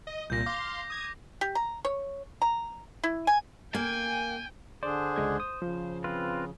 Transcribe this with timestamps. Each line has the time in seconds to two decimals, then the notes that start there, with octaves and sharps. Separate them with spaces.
0.07 D#5
0.30 C2 A#2 G6 A#6
0.46 F5 C6 D6
0.90 D#6 G#6
1.41 G4
1.55 A#5
1.85 C#5
2.42 A#5
3.03 E4
3.27 G#5
3.74 A#3 G5 G#5
4.83 D3 D4 G#4 C5 D5
5.16 C#2 G#3 G#6
5.40 D#6
5.62 C#3 F3
6.04 C4 F4 B4